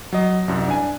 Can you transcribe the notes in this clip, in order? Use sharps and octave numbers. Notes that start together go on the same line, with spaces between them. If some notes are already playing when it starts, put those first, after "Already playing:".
F#3 D#5
C2 F#2
D4 G#5